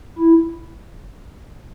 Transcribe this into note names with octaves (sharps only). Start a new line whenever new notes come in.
E4